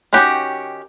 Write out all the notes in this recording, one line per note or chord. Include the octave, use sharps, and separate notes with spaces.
D#3 C#4 F#4 G4